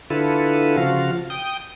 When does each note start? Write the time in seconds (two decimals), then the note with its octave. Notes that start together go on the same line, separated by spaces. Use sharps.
0.10 D3 E4 F4 A4 B4
0.77 C#3 F3 F4 F#4 F5
1.30 G5 D#6